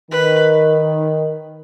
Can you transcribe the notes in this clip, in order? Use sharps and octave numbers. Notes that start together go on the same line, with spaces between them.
D#3 B4